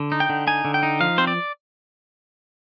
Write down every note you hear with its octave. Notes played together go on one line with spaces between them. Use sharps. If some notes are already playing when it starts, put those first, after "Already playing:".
Already playing: D3
D#4
G5
D3
D#4 G#5
D3
G5
D#4
F3 F5
C4 C5
D5